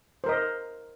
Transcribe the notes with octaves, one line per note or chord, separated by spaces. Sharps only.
A#4 C5 D#5